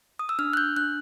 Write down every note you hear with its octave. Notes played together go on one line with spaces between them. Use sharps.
D#6
E6
D4 F6
F#6
G6
D4 F#6